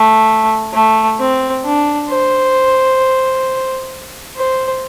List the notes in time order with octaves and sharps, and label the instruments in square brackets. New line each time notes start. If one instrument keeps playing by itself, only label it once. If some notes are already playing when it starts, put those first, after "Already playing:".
Already playing: [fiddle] A3
A3
C4
D4
C5
C5